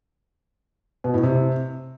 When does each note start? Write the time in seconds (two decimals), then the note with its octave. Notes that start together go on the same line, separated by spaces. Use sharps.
1.04 B2
1.14 A2
1.23 C3